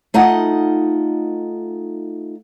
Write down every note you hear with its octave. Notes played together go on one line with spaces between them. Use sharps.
A3 D#4 F4 D#5 F#5